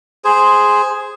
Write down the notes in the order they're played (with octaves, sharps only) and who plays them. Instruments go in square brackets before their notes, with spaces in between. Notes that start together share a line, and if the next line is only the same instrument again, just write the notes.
[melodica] G#4 C5